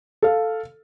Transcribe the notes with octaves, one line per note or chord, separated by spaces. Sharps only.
A4 F5